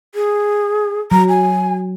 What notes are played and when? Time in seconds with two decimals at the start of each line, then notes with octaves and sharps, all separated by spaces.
0.15 G#4
1.11 F#3 A#5
1.29 G#5